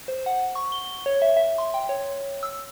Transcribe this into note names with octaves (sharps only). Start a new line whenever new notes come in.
C5
F#5
C#6
G7
C#5
E5
E5
C6
G5
C#5
E6